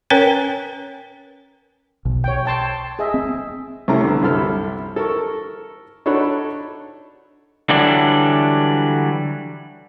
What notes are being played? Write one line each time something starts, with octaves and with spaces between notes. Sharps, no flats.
C#4 A#4 B4 C#5 G5 G#5
B1 B2
C#5 G5
G5 A5 C6
G#4 D#5 E5
C4
C2 C3 A3 C#4 A#5
D3 B3
C2 F#2 C3 A4 B5 F6
A4 A#4 C#6
D4 D#4 F#4 A4 C#5 B5
D3 E3 F#3 G3 D4